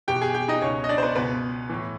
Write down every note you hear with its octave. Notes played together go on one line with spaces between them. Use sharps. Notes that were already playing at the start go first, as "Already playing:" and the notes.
E2 B2 G4 G5
G#4 G#5
G4 G5
D#4 D#5
C#2 B2 C#4 C#5
D#5
D4 D5
C5
B3 B4
C#2 B2 B3 B4
A2 E3